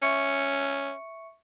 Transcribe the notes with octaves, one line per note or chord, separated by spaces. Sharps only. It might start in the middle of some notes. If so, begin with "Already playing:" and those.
C#4 E5 C#6 C#7